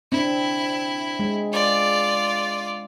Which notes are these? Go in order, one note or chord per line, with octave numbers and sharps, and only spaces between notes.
C4 D4 E4
G#3
F4 D5